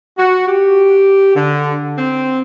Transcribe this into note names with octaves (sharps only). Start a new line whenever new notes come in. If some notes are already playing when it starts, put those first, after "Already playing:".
F#4
G4
D3
C4